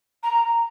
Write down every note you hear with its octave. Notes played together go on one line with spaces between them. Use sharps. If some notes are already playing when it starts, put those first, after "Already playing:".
A#5